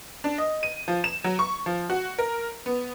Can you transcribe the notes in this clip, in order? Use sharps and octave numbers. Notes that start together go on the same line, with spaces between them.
D4
D#5
D#7
F3
E7
F#3
C#6
F3
F#4
A#4
B3